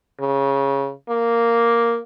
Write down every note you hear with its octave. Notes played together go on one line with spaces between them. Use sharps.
C#3
A#3